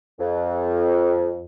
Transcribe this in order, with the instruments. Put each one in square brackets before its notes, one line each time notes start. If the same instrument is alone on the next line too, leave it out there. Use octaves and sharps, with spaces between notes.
[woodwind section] F2